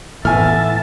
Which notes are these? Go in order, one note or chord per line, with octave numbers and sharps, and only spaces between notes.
A2 E3 B3 E5 G#5 A5 F6